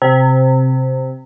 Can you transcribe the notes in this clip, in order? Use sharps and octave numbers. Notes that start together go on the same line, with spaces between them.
C3